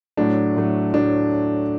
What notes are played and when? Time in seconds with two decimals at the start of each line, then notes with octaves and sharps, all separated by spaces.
0.17 A2 F#3 A3 D4
0.56 A2 F#3 A3
0.94 A2 F#3 A3 D4